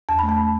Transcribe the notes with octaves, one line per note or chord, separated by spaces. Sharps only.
E2 A5
A3 B5
A5